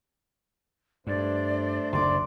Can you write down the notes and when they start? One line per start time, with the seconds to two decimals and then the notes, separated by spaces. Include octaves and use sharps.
1.07 G2 A3 D4 C5 D5
1.93 F#1 D2 D5 C6 D6